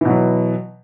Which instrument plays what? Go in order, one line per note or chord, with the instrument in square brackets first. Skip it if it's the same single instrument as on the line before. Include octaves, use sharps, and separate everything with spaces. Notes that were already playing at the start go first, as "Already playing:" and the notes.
[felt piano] E3
B2
F#3